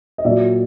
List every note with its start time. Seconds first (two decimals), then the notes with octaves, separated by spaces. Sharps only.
0.18 D#5
0.24 A#2 F#3 D5 E5